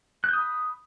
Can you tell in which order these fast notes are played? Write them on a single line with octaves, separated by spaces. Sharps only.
F#6 G6 D#6 B5